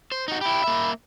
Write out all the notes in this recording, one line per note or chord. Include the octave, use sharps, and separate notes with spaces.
C5
D#4 F#4
E4 G4 B5
A#3 E5